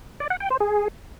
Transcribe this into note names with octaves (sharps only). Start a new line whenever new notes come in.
D5
F#5
G5
C5
G#4